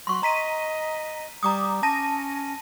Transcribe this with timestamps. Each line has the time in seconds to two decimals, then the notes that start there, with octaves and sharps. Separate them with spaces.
0.07 F#3 C6 C#6
0.23 D#5 A#5 B6 D#7
1.43 G3 A#5 D6 D#6
1.83 C#4 A5 A#6 D#7